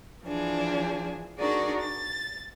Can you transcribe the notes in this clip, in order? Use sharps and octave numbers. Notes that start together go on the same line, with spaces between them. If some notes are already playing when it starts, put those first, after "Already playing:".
E3 F3 D4 G#4
D4 D#4 F#4 G#4 A#4 D5
A6